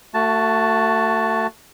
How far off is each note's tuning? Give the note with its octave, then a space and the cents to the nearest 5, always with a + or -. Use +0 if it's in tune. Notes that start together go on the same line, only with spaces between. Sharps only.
A3 +30 F#4 +0 A5 +0